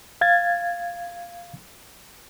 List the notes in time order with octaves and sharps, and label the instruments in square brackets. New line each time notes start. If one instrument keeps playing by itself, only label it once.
[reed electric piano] F5 G#6 A6